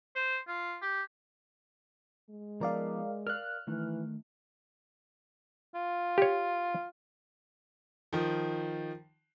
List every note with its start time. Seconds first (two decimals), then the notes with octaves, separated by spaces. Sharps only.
0.16 C5
0.48 F4
0.82 G4
2.30 G#3
2.61 F3 B3 D#4 A#4 D5 F5
3.27 A#4 D5 F5 F6 F#6
3.67 D#3 E3 A3 D#4
5.75 F4
6.18 G4 C#5
8.13 D#3 F3